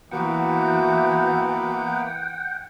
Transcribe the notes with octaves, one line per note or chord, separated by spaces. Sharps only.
E3 A#3 B3 F#4 F#5 G5